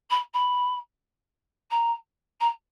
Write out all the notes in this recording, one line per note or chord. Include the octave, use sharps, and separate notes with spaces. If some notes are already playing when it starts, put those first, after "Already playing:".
B5
B5
A#5
A#5